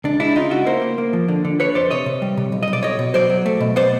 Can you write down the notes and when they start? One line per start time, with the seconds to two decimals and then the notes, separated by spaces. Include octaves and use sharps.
0.04 C#2 D4
0.20 G#3 D4 E4
0.35 C#3 D#4 F4
0.51 C#2 E4 F#4
0.66 A#3 A#4 C5
0.82 A#3
0.98 A#3
1.13 F3
1.28 D3
1.45 D3
1.59 D3 B4 C#5
1.75 F2 C5 D5
1.91 C3 C#5 D#5
2.06 C3
2.22 G3
2.37 C3
2.52 B1
2.63 B1 D#5
2.73 D5
2.83 B1 C#5 D#5
2.99 B2
3.14 F#3 C5 D5
3.30 F#3
3.46 A3
3.61 B2
3.76 B3 C5 D5